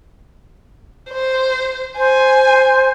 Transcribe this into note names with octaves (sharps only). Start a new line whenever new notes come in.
C5
C5 G#5